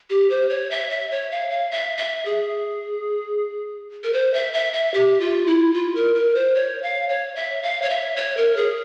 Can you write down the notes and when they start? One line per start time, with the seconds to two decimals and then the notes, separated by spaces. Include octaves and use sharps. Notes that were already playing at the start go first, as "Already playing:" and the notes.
0.10 G4
0.30 C5
0.50 C#5
0.71 E5
0.90 E5
1.11 C#5
1.31 F5
1.50 F5
1.71 E5
1.97 E5
2.26 G#4
4.04 A#4
4.13 C5
4.34 E5
4.53 E5
4.73 E5
4.94 G4
5.20 F4
5.47 E4
5.74 F4
5.95 A#4
6.15 A#4
6.35 C5
6.55 C#5
6.83 F5
7.09 C#5
7.36 E5
7.63 F5
7.82 C#5
7.90 E5
8.16 C#5
8.37 A#4
8.57 G#4